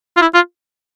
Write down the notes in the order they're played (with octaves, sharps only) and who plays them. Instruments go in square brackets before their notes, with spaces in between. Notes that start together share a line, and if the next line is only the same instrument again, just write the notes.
[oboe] F4
E4
F4